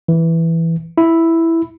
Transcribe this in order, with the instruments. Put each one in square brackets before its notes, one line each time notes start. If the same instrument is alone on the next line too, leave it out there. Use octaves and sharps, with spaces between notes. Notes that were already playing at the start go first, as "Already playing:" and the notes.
[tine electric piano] E3
E4